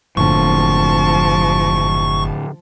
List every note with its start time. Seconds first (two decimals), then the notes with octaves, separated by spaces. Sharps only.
0.17 F#1 A2 D3 F3 A5 C#6